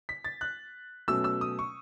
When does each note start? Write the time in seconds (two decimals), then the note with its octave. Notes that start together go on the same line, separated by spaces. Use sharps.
0.09 B6
0.24 A6
0.41 F#6
1.08 B2 F#3 A3 C#4 E6
1.24 E6
1.41 D#6
1.59 C#6